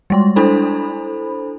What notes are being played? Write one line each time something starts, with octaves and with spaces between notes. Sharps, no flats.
G3 G#3 C6
D4 E4 A4 C5 B5